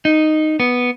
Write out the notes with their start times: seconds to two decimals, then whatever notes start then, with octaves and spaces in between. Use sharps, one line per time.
0.05 D#4
0.60 B3